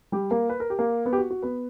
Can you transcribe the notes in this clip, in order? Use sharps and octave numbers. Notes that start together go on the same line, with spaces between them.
G3 G4
A#3 A#4
B4
A#4
G4
A#3 A#4
B3 B4
G4
F#4
F#4
B3 B4